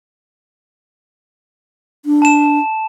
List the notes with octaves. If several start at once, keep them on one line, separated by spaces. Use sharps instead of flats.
D4
A5 E7